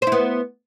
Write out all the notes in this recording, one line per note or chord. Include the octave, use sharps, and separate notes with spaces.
B3 E4 C5